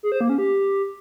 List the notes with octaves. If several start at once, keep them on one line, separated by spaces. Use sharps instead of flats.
G#4
C5
A#3
C#4
G4